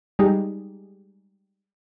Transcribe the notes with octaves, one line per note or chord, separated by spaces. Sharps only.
G3 G#3 D#4 G4 G#4